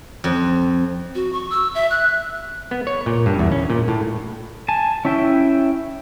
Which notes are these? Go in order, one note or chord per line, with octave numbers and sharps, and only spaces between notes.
F2
F#4
C#6
E6
E5
F#6
B3
C#5
A#2
G2
E2
C#4
A#2
A2
G#5 A5
C#4 E4 E5 G5